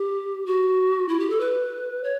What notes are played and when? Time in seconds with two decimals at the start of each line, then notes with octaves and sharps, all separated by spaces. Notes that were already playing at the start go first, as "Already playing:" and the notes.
Already playing: G4
0.46 F#4
1.09 E4
1.20 G4
1.30 A4
1.40 B4
2.04 C#5